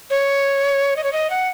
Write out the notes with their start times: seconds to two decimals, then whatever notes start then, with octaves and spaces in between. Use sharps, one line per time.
0.10 C#5
0.96 D#5
1.04 C#5
1.13 D#5
1.30 F#5